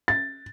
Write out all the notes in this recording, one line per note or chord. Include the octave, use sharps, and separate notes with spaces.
A6